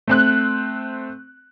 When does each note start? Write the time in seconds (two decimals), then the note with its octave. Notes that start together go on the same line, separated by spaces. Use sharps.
0.07 A3 C4 F#6